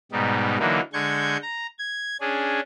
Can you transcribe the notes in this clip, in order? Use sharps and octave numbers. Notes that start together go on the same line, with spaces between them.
G#2 B2 G3 D#4
D3 E3 F#3 A#3 D#4
D3 G#3 C#6 G6 G#6
A#5
G#6
C#4 D4 G#4